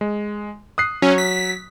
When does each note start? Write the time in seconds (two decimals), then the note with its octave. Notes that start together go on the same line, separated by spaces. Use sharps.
0.01 G#3
0.78 D#6 F#6 C7
1.02 F#3 C#4
1.18 B6